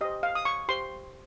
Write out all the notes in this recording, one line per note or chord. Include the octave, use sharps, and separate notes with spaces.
G4 C5 D#5
F5
D#6
C#6
G4 C5 C6